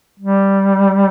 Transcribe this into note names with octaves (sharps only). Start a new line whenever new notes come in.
G3